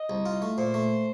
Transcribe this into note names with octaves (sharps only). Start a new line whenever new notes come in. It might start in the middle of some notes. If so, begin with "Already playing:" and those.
Already playing: D#5
C2
F4
A3
A#2 C5
A3